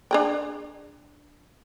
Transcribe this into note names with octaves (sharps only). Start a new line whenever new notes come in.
D4 G#4 G5